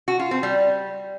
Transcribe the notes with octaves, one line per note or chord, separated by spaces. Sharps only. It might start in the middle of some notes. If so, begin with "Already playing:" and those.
F#4
F4
C4
G3